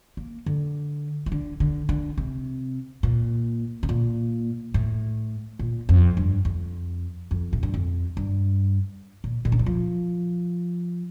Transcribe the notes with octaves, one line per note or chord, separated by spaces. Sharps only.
A#3
D3
E3
D3
D3
D3
C3
A#2
C3
A#2
A2
A#2
F2
G2
F2
F2
A2
G2
F2
G2
A#2
A#2
D3
E3
F3